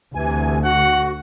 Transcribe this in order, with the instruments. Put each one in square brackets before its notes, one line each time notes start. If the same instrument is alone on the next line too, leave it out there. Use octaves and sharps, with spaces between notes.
[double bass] D2 [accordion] C3 E3 G#5
[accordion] F#4 [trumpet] F#5